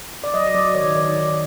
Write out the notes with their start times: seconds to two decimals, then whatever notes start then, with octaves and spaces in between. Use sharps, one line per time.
0.24 D5
0.33 F#3 D#5
0.54 F#3 D5
0.75 D#3 C#5
0.95 D#3 D5
1.16 D#3